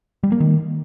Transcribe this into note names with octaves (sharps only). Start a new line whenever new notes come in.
G3
A#3
D#3